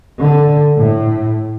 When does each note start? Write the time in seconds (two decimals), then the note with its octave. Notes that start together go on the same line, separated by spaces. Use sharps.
0.22 D3
0.77 A2